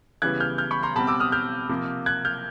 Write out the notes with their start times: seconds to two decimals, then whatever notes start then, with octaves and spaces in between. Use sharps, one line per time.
0.22 C#3 E3 G3 B3 F#6 G#6
0.40 F6 G6
0.58 F6 G6
0.71 B5 C#6
0.83 A#5 C6
0.96 B2 G3 C4 A5 B5
1.07 D6 E6
1.20 D#6 F6
1.32 F6 G6
1.69 C3 F3 A#3
2.06 F#6 G#6
2.25 F6 G6